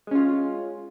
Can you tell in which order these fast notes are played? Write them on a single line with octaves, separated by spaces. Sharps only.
G#3 C#4 F4